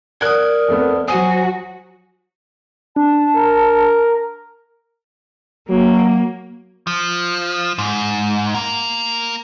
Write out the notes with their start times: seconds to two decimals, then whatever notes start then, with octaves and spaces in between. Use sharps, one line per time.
0.21 A#4 D5 D#6 F#6 G#6
0.68 F2 A3 B3
1.08 F#3 F#4 C5 G#5 D#6
2.96 D4 A5
3.36 A#4
5.68 F#3 A#3
6.87 F3
7.78 G#2
8.54 A#3 A#4